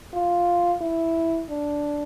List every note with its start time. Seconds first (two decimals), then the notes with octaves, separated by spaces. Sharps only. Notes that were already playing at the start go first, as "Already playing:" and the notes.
0.13 F4
0.81 E4
1.50 D4